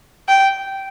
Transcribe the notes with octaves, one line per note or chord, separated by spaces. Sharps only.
G5